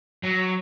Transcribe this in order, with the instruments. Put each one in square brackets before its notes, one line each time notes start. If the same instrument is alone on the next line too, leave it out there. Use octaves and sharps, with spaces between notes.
[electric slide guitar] F#3